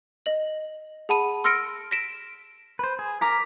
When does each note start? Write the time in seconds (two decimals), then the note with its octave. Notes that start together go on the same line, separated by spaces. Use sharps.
0.26 D#5 F#7
1.09 G#4 F#5 A5 B5 D#7
1.44 C6 E6 F6 A#6 C#7 D7
1.91 A#6 B6 D7 E7
2.79 B4 C5
2.99 G#4
3.21 A#4 A#5 D6 B6